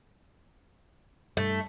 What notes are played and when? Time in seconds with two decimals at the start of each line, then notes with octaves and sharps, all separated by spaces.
1.37 G2 A3